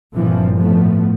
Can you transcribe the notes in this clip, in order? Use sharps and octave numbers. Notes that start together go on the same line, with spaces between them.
G1 G2 A#2 E3 F3 C4
A2 F3 A3 B3